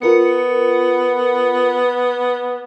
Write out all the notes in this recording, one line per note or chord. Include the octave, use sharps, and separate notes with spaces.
B3 F4 A#4 C#7